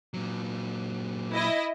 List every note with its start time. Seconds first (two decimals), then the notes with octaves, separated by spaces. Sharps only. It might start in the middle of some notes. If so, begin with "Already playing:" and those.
0.14 A#2 F#3
1.32 E4 D#5